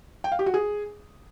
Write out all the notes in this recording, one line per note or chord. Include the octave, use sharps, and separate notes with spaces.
G5
F5
G4
F#4
G#4